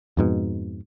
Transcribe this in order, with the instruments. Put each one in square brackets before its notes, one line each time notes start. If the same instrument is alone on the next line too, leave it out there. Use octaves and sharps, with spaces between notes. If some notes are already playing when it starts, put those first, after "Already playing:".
[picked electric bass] F2 G#2 B2